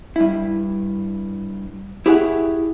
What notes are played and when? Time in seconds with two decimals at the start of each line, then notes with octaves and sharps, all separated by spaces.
0.16 G2 E4
2.06 E4 G4 G#4 C#5 E5 F#5